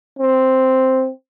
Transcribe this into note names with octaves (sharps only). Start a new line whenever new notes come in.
C4